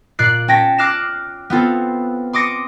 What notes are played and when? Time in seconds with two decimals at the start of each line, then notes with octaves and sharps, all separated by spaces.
0.19 A#2 D5 F#6 C7
0.48 C#4 G5 A5 A#6 B6
0.78 D6 F6 F#6 A#6 C7 E7
1.50 B3 C4 F4 A4
2.33 C6 D6 D#6 A#6 C#7